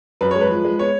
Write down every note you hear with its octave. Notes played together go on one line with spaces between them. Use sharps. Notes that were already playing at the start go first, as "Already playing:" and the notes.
F#2 B4
G#3 C#5
B4
F3
G#3
B3 C#5